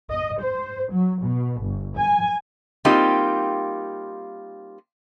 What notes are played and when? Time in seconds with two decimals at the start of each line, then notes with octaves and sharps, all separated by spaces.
0.11 D#5
0.42 C5
0.92 F#3
1.24 B2
1.62 G1
1.98 G#5
2.85 G3 A#3 C4 D#4 F4 G4